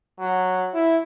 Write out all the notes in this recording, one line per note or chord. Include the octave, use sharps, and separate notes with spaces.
F#3
E4